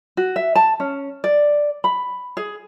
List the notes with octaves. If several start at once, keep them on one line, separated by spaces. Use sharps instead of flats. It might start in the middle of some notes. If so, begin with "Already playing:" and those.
F#4
E5
A5
C#4
D5
B5
G#4